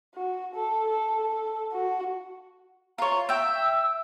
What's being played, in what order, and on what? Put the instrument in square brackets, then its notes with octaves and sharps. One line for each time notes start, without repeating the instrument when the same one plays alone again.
[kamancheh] F#4
A4
A4
A4
F#4
[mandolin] F4 C#5 [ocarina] A#5
[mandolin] E5 G5 [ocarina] E6